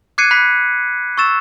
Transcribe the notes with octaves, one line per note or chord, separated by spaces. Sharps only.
D6 F#6 G#6 C7 C#7 D#7
B5 F#6 B6 C7
C#6 E6 A6 E7